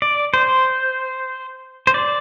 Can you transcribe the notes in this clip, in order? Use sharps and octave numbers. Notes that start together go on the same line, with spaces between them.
D5
C5
C5
D5